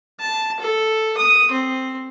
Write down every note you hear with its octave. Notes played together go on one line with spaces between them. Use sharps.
A5
A4
D#6
C4